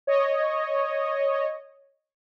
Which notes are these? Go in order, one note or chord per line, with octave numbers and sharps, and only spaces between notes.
C#5 D#5